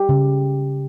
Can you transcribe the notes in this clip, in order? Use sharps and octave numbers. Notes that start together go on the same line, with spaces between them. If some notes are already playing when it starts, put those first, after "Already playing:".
Already playing: G4
C#3